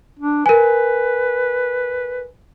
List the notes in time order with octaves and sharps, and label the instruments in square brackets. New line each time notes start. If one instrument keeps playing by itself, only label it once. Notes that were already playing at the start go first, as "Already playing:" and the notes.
[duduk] D4
[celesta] A#4 G#5 [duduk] B4